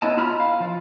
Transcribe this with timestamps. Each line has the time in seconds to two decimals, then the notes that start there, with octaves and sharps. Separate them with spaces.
0.02 B3 C#4 E4 D#5 A5
0.17 F4 A#5 B5 F6
0.40 F5
0.60 F3 F4